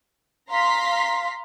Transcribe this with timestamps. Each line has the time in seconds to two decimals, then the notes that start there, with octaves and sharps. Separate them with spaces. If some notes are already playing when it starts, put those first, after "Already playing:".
0.50 F5 A#5 C6 B6